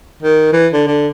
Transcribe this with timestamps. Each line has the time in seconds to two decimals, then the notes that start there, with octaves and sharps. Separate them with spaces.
0.23 D#3
0.53 E3
0.73 D3
0.87 D3